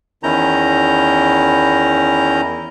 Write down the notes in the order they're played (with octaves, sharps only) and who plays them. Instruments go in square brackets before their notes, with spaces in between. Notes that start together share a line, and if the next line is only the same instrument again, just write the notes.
[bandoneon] E2 D#3 C#4 E4 A#5 G6